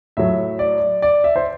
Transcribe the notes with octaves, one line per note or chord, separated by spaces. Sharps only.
A2 F#3 E5
D5
D5
E5
C5